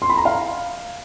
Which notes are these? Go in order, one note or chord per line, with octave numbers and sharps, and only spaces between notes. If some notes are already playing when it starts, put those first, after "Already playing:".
C6
B5
A#5
F5